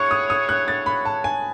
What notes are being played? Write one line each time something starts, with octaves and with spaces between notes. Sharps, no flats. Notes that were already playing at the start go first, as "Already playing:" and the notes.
Already playing: E4 G#4 C#5 F#5 C#6
D#6
D#6
F#6
A6
B5
A5
G#5